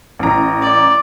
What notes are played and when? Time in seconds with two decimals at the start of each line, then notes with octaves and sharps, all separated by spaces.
0.19 A1 A#5
0.61 D5